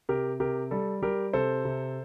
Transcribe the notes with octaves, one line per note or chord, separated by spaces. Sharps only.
C3 G4 A#4
C3 G4 A#4
G3 A4
G3 G4 A#4
C3 A4 C5
C3